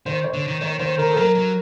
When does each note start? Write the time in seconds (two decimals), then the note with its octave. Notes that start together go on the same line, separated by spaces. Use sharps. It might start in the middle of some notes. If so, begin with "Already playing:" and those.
0.06 D#3 C5
0.24 C#5
0.33 D3
0.47 D#3
0.61 D#3 C#5
0.79 D#3 C5
0.98 D#3 A#4
1.12 A4
1.16 F#3 A#4
1.35 F#3